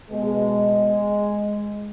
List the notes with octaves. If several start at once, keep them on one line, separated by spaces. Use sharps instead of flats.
B2 G#3